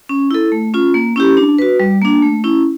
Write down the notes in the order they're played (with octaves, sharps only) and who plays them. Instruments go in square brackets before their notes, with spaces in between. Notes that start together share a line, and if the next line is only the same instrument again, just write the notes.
[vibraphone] C#4
E4 A4
A3
C#4 F4
A#3
C#4 E4 G4
D4
F#4 B4
G3
A#3 D4
A3
C#4 E4